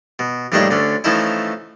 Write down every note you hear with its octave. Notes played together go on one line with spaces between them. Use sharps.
B2
A#1 G2 A3 D4 D#4 C#5
D2 D3 C#4
E3 F3 A3 C#4 D#4 E4